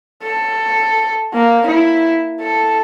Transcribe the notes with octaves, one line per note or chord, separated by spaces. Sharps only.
A4
A#3
E4
A4